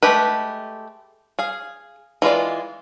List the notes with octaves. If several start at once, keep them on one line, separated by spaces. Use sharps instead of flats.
G#3 A3 G4 B4
G#4 F5
E3 G#3 F4 D5